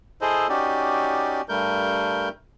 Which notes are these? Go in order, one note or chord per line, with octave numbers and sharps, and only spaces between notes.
E4 G#4 A4 C5 D#5
C#4 D#4 F#4 G4 D5
G2 G3 A3 A#4 G6